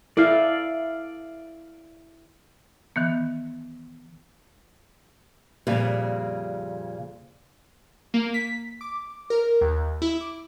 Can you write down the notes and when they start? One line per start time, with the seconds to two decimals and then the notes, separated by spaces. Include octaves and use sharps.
0.17 E4 A4 D5 F5
2.96 D#3 E3 B3
5.67 F2 A#2 C#3 G3
8.14 A#3
8.34 B6
8.81 D6
9.30 A#4
9.61 D#2
10.02 E4
10.21 D6